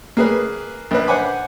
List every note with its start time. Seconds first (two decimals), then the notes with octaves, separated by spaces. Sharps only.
0.17 A#3 G#4 B4
0.91 A#1 B4
1.07 C5 F#5 G#5 B5 D6